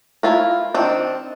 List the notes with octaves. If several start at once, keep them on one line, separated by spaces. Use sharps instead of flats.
E4 F4 A#4
D#3 C4 D4